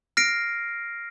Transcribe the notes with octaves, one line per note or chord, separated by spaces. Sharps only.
F6 A#6 C7 D7